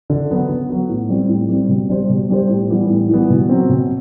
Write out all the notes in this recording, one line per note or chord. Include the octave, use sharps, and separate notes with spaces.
D3
F#3 B3 F#4
D3
F#3 B3 F#4
A2
G3 C4
A2
G3 C4
B2
G3 D4 G4 C5
B2
G3 D4 G4 C5
A2
E3 G3 B3
A2
E3 G3 B3
B2
F#3 C4
B2